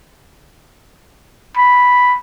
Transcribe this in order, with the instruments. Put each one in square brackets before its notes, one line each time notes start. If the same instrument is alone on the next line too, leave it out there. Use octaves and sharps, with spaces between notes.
[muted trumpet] B5